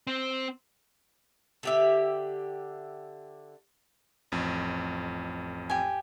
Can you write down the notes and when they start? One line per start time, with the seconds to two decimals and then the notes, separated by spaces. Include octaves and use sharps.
0.07 C4
1.63 D3 G4 E5
4.32 A1 F2
5.70 G4 G#5